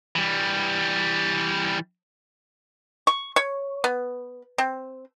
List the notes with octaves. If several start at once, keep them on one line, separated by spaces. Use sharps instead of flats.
E3 G3
C#6
C#5
B3
C4